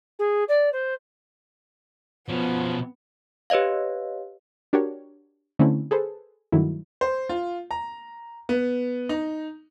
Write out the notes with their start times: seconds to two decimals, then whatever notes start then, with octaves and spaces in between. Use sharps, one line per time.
0.19 G#4
0.48 D5
0.72 C5
2.29 B2 F3 B3 C#4
3.50 G4 B4 C#5 D#5 F5
4.73 D4 F#4 G4 A#4 C#5
5.59 D3 A3 C4 C#4 E4
5.91 G#4 A4 B4 C5
6.52 G2 D#3 F#3 A3 E4
7.01 C5
7.29 F4
7.71 A#5
8.49 B3
9.09 D#4